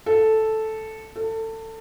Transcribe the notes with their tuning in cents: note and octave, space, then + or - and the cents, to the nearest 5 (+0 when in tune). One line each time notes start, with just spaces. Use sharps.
A4 -5
A4 +25